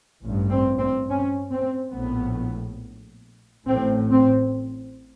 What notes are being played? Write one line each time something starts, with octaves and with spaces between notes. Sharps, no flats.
A1 G2
C4
C4
C#4
C4
A#1 A2 B3
A1 A2 C4
C4